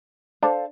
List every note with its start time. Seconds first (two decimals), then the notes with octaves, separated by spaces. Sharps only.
0.42 D4 A4 C5 F5 A5